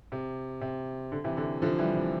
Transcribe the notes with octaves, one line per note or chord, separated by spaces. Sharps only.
C3
C3
D3
C3 E3
D3
D3 F3
E3 G3
C3